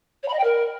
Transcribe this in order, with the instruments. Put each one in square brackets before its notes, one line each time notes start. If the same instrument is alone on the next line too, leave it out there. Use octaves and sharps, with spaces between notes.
[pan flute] C#5
B5
D#5
G5
A#4